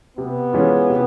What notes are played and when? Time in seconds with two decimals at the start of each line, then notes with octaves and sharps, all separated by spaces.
0.17 C3 B3
0.53 E3 G#3 C#4 F4
0.89 C3